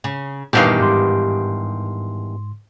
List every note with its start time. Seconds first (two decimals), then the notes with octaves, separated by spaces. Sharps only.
0.04 C#3
0.53 E2 G2 A#2 D#3 G4 B4 F5
0.80 G#2 C6